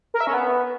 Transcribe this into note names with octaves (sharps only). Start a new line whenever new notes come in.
A#4
E5
C#4
B3